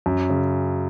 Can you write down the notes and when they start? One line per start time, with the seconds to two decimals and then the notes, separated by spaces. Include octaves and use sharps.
0.06 F#2
0.30 C#3